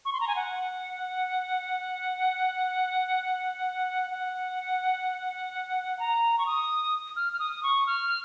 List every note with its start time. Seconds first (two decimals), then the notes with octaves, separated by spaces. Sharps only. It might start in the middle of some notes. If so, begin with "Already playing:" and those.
0.05 C#6
0.13 C6
0.20 A#5
0.28 G#5
0.36 F#5
4.11 F#5
5.99 A#5
6.38 C#6
6.46 D#6
7.16 F6
7.33 F6
7.39 D#6
7.63 C#6
7.87 F6